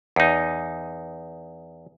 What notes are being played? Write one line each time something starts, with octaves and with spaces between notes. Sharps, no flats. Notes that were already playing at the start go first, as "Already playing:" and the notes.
E2 D#4